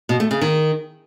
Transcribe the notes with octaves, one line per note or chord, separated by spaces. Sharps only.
B2
A3
C#3
D#3